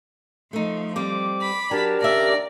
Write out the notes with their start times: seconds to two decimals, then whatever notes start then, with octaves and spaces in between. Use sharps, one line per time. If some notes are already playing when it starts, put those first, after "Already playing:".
0.53 F3 A3 D#4
0.96 G3 C4 D6
1.41 B5
1.71 F#3 D4 G4 A#4 A5
2.01 D#2 C#3 D5 E5 A#6